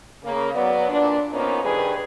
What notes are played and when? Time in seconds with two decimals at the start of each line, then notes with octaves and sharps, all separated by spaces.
0.24 C#3 A#3
0.54 F#3 B3 D5
0.89 A#2 D4
1.32 A#3 B3 C#4 D#4 F4 C5
1.64 G2 D#3 G3 G#4 B4